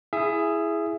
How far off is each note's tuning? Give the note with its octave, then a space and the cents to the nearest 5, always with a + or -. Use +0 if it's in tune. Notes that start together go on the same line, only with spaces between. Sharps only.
E4 +0 G#4 +0 E5 +25